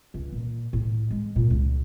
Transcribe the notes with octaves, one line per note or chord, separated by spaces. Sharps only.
C#2
A#2
A2
G#3
A#2
C#2